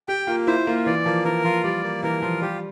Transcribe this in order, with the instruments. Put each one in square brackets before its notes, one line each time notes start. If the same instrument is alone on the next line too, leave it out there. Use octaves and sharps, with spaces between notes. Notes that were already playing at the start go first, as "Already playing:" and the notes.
[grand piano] G4 [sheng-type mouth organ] G5
[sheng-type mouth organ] A#3 [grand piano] F4
[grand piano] E4 [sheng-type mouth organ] C5
[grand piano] A#3 [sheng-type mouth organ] F4
[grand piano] E3 [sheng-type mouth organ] D5
[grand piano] F3 [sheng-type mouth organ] A#3
[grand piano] E3 [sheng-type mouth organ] A#4
[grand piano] F3 [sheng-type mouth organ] F4
[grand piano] G3 [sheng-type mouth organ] D5
[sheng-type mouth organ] A#3
[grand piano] E3 [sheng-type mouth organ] A#4
[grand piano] F3 [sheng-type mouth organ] F4
[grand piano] G3 [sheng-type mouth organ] G4